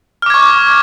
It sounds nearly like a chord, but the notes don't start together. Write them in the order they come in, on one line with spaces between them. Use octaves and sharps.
F6 D6 G#6 C#6